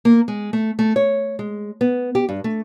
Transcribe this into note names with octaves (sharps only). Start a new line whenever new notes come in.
A#3
G#3
A3
A3
C#5
G#3
B3
G4
G2
A3